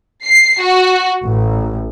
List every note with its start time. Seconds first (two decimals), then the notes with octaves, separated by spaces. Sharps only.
0.25 C7
0.62 F#4
1.25 A1